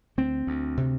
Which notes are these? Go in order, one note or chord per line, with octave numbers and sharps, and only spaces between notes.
D2 C4
D2
C3